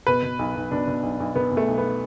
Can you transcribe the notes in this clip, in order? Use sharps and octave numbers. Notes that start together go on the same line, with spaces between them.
B2 B4
B2
B1
B1
B2 D4
B2
B1
B1
B2 B3
B2
A3
B1
B3